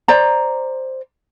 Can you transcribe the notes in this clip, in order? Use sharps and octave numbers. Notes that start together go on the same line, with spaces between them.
C5 D5 A#5